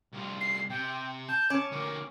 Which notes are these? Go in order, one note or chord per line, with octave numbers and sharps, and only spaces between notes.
C2 F4
C7
C3 G5
A5 G6
C#4 D6
D2 A#3 D6